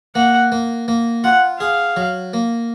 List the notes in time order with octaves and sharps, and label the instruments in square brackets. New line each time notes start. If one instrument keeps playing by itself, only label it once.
[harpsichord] A#3 [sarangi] F#5
[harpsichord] A#3
A#3
[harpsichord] F4 [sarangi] F#5
[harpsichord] G#4 [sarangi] F5
[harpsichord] F#3
A#3